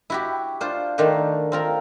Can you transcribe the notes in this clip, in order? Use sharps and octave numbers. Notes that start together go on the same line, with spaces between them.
E4 F#4 G4
D4 F4 C5
D#3 A3 D4 C5
C4 F4 A#4